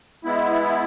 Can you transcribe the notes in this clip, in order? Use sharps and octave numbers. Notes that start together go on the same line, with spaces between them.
G#3 B3 E4